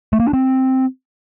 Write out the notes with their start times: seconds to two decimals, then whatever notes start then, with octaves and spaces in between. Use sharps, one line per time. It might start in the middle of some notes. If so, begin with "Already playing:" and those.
0.13 A3
0.20 A#3
0.27 D4
0.33 C4